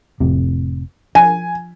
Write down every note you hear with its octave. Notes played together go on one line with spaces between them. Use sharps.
F1 A2 C3
F3 G#5